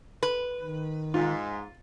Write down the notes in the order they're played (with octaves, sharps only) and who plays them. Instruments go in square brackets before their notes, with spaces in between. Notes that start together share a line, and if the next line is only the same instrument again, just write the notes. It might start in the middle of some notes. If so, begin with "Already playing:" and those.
[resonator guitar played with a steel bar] B4
[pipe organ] D#3
[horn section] G#2 [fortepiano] F4